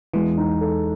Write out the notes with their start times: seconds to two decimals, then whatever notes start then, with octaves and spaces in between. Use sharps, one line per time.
0.14 E2 E3 G#3
0.37 D#4
0.61 A4